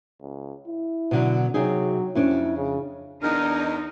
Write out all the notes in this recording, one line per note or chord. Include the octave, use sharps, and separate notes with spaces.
C#2
E4
B2 D3 F#3
C3 F#3 D#4 G#4
F2 C#4 D4 E4
C#3
E2 D4 D#4 A#4